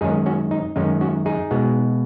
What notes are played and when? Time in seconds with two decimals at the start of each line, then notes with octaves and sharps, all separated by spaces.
0.01 F#2 D#3 G#3 C#4 D#4 G#4
0.26 C#4 F#4
0.51 D#4
0.76 F#2 D#3 G#3 C#4 D#4
1.01 C#4 F#4
1.26 D#4 G#4
1.51 B2 G#3 B3